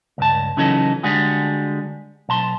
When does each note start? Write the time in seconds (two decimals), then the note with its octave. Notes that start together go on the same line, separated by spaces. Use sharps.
0.18 C#2 G2 A5
0.57 C#3 E3 F#3 C#4 D#4 A4
1.03 D3 G3 G#3 F#4 G#4
2.29 B1 A5 C6